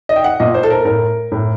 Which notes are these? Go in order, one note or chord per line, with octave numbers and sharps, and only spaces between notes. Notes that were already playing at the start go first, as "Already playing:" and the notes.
D#5
G5
F#5
A#2 D#5
C5
A4
A#4
A2 A#4
A2